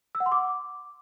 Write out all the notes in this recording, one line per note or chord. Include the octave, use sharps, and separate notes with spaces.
E6
F#5
C6
D6